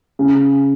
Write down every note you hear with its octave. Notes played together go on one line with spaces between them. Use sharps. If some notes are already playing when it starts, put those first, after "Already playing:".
C#3